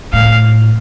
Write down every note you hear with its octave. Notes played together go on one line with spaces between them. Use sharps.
A2 F5